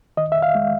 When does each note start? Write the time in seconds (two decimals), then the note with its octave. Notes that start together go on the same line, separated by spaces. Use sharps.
0.17 D#3 D#5
0.32 E5
0.42 F5
0.55 G#3